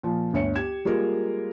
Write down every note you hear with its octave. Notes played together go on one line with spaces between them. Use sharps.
A#2 F3
G1 D2 C#5 C#7
G4 G#6 E7
G3 G#3 A#3 F4 A#4